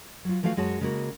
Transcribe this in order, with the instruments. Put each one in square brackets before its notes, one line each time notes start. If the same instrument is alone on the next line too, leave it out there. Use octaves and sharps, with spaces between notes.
[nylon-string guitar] F#3 F4
E3 F3 A3 F#4 F5
F#2 G#3 F#4 C#5 A5
C#3 G#3 A#3 F#4